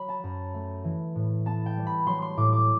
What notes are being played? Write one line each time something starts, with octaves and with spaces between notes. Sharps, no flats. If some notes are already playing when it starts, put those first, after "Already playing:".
Already playing: F#3 B5
A5
F#2
A3
E3
A2
B3 A5
G5
G3
B5
F#3 C6
C6
A2 D6
D6